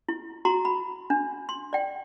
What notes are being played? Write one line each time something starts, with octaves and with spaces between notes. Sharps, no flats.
E4
F#4 A#5 C6
B5
D4
C6
D5 G5